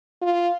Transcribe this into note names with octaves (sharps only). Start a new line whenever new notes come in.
F4